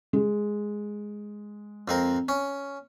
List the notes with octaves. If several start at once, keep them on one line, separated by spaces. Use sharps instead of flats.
G#3
F2 C4 A#4
C#4